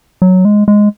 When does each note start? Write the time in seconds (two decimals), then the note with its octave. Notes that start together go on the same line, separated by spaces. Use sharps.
0.22 F#3
0.45 G#3
0.68 G#3